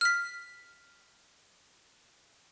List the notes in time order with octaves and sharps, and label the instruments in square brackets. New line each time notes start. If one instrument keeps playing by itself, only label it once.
[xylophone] F6 B6